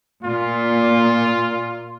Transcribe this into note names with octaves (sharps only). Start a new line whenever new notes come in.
A#2 F4